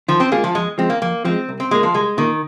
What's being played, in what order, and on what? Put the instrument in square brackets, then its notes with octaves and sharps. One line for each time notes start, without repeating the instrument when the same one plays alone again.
[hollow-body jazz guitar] D#3 [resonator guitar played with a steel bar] F3
[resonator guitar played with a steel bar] C4
[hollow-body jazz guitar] G#3 F4 G#4 [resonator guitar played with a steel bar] A#3
[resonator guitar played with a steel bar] F3
[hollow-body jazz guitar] F2 [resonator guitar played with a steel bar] G#3
[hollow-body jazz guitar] F3 G#3 [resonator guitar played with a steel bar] C4
[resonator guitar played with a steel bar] A#3
[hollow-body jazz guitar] F2 [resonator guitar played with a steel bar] A#3
[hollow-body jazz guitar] F3 G#3 [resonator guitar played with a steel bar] C4
[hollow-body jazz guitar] C2
[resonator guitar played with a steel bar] C4
[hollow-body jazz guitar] A#2 A#3 [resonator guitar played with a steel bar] G#3
[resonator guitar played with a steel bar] F3
[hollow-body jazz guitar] C2 [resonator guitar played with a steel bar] G#3
[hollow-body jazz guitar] A#2 A#3 [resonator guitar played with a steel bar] D#3